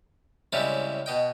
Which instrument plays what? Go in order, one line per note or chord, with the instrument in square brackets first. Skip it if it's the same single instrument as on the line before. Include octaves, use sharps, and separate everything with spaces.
[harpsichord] A2 C#3 G3 G#3 C4 E4
B2 D#5 G5